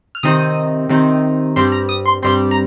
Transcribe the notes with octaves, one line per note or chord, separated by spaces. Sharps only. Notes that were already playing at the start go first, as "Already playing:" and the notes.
F6
C3 D#3 C4 D#4 D#6
C3 D#3 C4 D#4
G2 G3 C4 C6
A#5
D#6
C6
G2 G3 C4 C6
A#5